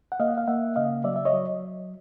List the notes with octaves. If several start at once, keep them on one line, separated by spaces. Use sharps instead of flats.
F#5
A#3 D#5 F5
F5
A#3 E5 F#5
C#3 D#5 F5
F#3 D5 E5
E5
C#5 D#5
F#3